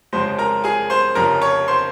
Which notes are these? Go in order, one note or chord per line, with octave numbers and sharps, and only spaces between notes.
F1 F2 C#3 G#3 C5 C6
A#4 A#5
G#4 G#5
C5 C6
F1 F2 C#3 A#4 A#5
C#5 C#6
C5 C6